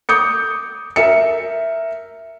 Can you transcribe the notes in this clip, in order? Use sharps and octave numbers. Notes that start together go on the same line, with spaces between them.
D6 D#6 G6 C#7
A#4 E5 C#7